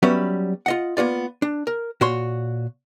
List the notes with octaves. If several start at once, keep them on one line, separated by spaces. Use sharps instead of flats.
F#3 G3 B3 C#4 B4 E5
F4 D#5 F#5
A#3 B3 F4 D5
D4
A#4
A#2 F#4 C#5 C6